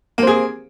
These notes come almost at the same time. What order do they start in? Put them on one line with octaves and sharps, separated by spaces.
A#3 C4 G#4